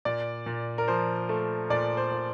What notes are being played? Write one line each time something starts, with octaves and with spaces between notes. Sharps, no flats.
A#2 D5
A#2
A#4
F3 C5
A3
A#2 D5
C5
A#2